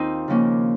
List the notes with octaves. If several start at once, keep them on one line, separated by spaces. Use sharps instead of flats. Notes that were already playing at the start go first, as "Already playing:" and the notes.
Already playing: D#2 C4 D#4 F4
D#2 C#3 F3 A#3 C#4